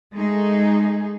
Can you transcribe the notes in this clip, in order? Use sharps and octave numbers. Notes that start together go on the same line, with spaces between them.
G#3 A3 D#4 G#4